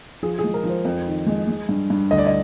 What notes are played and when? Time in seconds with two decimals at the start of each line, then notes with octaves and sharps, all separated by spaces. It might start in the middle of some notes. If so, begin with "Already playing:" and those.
0.23 F3 G#4
0.39 G#4
0.44 G#3
0.54 A#4
0.64 F3
0.69 C5
0.85 F2
1.06 D#3
1.26 G#3
1.47 G#3
1.69 G2
1.90 G2
2.11 D2 D#5
2.18 D5
2.27 D#5